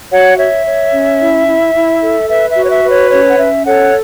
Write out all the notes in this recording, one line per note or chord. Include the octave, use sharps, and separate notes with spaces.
F#4 C#5 F#5
C#5 E5
C#5
C#4
E4
E4
E4
A4
B4 E5
E5
F#4
C#5
E5
B4
C#5
C#4 C#5
F#5
C#4 E5
A4 C#5 F#5